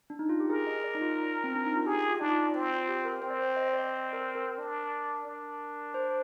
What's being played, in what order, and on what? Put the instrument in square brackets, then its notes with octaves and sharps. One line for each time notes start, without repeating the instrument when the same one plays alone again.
[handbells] D4
D#4
F4
G4
[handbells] G#4 [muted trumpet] A#4
[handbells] D#5
D5
D#4
F4
C4
D4
D#4
F4
[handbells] G4 [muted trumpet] G#4
[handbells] F4
[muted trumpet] D4 [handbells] D#4
[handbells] F4
[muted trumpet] C4 [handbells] F4
[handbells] F4
G4
A#4
[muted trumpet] C4 [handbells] C5
[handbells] D5
C5
D#5
D#5
D5
A#4
A#4
[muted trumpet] D4
D4
[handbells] C5